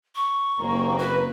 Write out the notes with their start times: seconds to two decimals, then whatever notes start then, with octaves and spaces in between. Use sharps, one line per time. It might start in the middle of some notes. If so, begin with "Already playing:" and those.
0.15 C#6
0.59 F#1 D#2 A#3 C4 A#5
0.99 F#4 B4